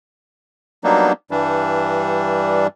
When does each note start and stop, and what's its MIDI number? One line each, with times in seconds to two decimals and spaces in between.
0.84 1.12 54
0.84 1.12 55
0.84 1.12 58
0.84 1.12 59
0.84 1.12 62
0.84 1.12 63
1.31 2.67 43
1.31 2.67 52
1.31 2.67 55
1.31 2.67 62